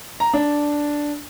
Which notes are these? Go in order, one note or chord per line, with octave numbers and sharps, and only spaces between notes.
A#5
D4